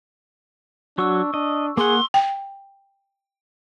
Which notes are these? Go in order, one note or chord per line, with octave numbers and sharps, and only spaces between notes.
F#3 D4 F#4 C#6 E6
D4 D#5
A#3 G#4 F#5 C6
G5